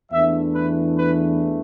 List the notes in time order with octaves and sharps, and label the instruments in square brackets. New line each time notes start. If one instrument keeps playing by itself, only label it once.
[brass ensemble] E2 E3 A3 D4 E5
B4
B4